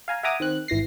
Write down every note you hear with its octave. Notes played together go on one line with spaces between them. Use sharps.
F5 G#5 A#5
E5 F#5 G#5 A#5 D6 D#6
D#3 C4 F#6
G#1 E3 A#6 C7